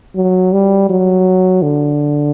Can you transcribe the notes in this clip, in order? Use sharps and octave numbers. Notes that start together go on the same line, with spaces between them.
F#3
G3
F#3
D3